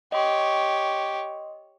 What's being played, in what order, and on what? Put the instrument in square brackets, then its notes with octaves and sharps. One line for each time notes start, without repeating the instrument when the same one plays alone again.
[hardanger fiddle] G4 C#5 [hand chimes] D#5 C6